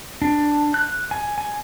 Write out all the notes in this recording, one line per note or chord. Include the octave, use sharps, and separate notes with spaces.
D4
F#6
G#5
G#5